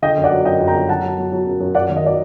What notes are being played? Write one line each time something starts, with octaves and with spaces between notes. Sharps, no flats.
D3 D#5 G5
F#2
D5 F#5
F#3
F#2 D#5 G5
F#2
G5 A#5
D3
F#2 F#5 A5
F#3
F#3
F#3
F#2
F#2
F#2 D5 F#5
D#3
D#5
F#3 D5